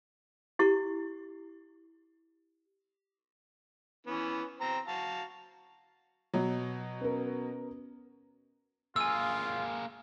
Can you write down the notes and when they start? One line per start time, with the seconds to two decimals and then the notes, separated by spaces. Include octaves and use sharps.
0.59 E4 G4 C#6
4.07 E3 B3 C#4
4.61 C4 A#5
4.88 F#4 F5 A5
6.33 B2 F#3
7.01 B3 C#4 A#4
8.96 A#3 F4 G#4 G#5 E6